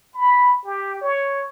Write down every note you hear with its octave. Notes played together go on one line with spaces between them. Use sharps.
B5
G4
C#5